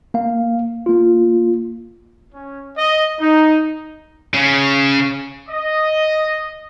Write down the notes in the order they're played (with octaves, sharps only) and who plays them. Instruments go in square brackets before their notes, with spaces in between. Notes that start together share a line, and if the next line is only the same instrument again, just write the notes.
[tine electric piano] A#3 F5
A#3 F4
[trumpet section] C#4
D#5
D#4
[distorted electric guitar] C#3
[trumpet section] D#5